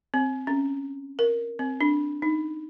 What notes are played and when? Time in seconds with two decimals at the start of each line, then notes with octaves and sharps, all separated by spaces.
0.14 C4
0.47 C#4
1.19 A#4
1.59 C4
1.81 D4
2.22 D#4